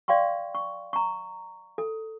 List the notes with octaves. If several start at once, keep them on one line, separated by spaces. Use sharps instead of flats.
D5 F5 G5 C6 C#6
C#6
A#5 C#6
A4